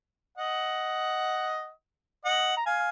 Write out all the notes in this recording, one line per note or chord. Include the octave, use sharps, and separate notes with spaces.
D#5 F#5
D#5 F#5
A#5
F5 G#5